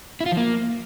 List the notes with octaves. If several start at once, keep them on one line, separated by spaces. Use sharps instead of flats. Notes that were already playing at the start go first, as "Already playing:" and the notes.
E4
F4
F3
A#3